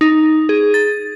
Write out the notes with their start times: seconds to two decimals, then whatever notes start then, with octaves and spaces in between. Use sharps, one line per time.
0.01 D#4
0.49 G#4
0.74 A6